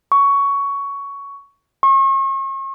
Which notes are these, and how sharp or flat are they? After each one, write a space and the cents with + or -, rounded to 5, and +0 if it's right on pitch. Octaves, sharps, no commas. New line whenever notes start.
C#6 +15
C#6 -40